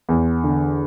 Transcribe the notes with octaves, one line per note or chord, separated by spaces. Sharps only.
E2
D3